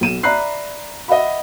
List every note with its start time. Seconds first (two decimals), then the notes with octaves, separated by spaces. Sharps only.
0.01 B1 D#7 E7
0.23 D5 E5 A#5 B5 F#6 C7
1.08 D#5 E5 F#5 B5